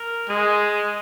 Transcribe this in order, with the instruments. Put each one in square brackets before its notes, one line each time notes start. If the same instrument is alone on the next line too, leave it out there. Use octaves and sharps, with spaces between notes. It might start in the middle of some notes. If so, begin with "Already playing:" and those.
Already playing: [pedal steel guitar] A#4
[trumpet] G#3 [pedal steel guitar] G#4